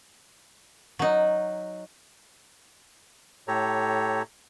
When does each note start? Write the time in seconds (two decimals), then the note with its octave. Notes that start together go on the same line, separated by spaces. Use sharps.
0.99 F#3 D#4
3.48 A2 G4 A4 C#5 A#5